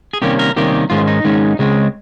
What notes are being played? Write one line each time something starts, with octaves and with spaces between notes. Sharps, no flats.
G#4
C3 D#3 G3 A#3 C#4 G4
A#4
C3 D#3 G3 A#3 C#4 G4
G#2 D#3 G#3 C#4 F4
D#4
G#2 D#3 G#3 C#4
C#2 C#3 G#3 C4